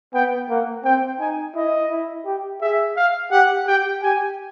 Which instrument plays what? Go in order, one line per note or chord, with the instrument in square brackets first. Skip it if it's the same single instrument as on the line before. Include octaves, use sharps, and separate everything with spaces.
[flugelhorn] B3 [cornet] G5
[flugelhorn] A#3 [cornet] F#5
[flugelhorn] C4 [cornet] G5
[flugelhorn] D#4 [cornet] G#5
[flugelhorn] E4 [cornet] D#5
[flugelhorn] E4
G4
[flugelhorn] G#4 [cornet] E5
[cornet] F5
[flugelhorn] G4 [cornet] F#5
[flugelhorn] G4 [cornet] G5
[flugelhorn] G4 [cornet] G#5